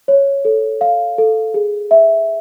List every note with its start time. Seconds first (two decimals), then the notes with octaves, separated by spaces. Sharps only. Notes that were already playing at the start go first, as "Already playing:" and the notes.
0.08 C#5
0.45 A4
0.81 F5
1.18 A4
1.54 G#4
1.91 E5